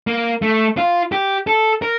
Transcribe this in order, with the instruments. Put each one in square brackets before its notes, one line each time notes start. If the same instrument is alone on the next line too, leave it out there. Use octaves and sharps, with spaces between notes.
[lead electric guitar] A#3
A3
F4
G4
A4
A#4